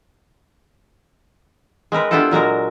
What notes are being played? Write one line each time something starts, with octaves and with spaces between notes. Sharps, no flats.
G#3 C4 A#4 B4
B3 D4 E4 F4 G4 A4
A#2 F#3 G#3 A#4